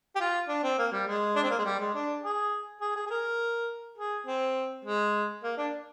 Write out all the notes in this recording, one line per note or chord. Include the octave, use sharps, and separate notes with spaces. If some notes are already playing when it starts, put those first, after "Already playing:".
G4
F4
D4
C4
A#3
G3
G#3
D4
C4
A#3
G#3
G3
G#3
D4
G#4
G#4
G#4
G#4
A#4
G#4
C4
G#3
A#3
D4